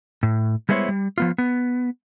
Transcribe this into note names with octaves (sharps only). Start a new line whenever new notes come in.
A2
G3 G#3 B3 E4 C5 C#5
G3
F3 B3 F4
B3